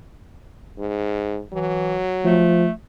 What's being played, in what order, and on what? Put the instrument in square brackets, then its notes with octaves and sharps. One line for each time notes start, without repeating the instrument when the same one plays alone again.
[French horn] G#2
[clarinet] E3 [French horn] F#3
[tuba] F3 [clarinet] A3